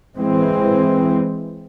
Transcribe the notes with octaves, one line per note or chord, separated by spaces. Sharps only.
E3 G#3 C4